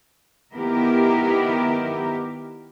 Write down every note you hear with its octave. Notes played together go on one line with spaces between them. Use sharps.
D#3 B3 E4 G4 A#4